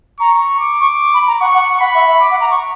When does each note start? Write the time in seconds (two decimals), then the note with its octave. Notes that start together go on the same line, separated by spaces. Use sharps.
0.19 A#5 C#6
0.60 D6
0.80 C#6
1.14 B5
1.27 A#5
1.40 F#5 C#6
1.54 F#5
1.80 F#5 B5
1.94 E5
2.07 E5
2.21 D6
2.31 F#5
2.41 A#5
2.50 C#6